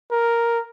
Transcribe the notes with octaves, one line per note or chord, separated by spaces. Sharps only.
A#4